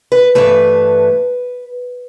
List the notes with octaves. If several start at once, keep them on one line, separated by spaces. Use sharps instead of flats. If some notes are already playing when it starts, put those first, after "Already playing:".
B4
G2 E3 A3 B4